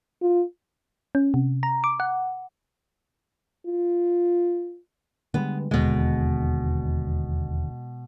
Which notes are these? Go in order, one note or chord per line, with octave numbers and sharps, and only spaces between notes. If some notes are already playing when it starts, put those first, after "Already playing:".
F4
C#4
C3
A#5
D6
F#5
F4
D3 G3 G#3 B3
E1 D#2 B2 D3 G#3